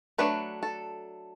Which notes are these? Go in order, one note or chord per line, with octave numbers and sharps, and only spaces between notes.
F#3 A3 D4 B4
A4